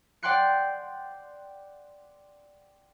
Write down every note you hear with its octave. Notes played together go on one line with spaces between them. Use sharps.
D5 F#5 G5 C6 F#6 C#7